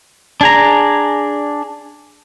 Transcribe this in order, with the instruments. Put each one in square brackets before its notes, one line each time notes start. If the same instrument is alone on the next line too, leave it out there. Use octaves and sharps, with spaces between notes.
[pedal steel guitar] D4 G#4 A#5